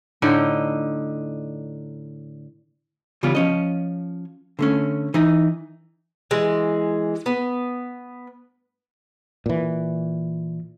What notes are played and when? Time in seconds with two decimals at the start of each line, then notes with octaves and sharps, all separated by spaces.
0.22 A2 D3 D#4 G5
3.23 C#3 E3 G3 B3 E4 F4
3.35 F3 C#4 D#5
4.59 D3 A3 C#4
5.14 E3 D#4
6.31 E3 G#3
7.26 B3
9.46 A#2 E3